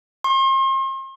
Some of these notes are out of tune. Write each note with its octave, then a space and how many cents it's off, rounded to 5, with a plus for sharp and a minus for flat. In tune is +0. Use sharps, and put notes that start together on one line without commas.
C6 +40